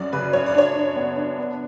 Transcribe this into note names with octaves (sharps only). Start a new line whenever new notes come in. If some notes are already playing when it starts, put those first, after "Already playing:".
Already playing: F#2 F#3 C#4 D5
C#3 B4
F#2 C#5
D5
D4 C#5
D4
B3
D4
B3